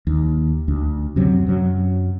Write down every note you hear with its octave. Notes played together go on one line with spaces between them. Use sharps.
D#2
D2
F#2 C3 F#3
F#2 F#3